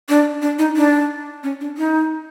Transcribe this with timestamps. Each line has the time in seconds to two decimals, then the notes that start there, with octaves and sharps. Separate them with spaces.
0.09 D4
0.42 D4
0.59 D#4
0.77 D4
1.43 C#4
1.61 D4
1.78 D#4